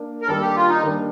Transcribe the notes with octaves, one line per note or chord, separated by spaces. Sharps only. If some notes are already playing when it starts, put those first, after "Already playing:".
Already playing: A#3 D4
A#4
D#3 G3 A#3 D4 A4
G4
F4
D#4
D#3 G3 A#3 D4